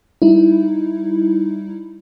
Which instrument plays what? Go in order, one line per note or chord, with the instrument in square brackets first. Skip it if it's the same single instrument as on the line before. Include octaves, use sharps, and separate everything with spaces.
[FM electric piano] G3 D#4 E4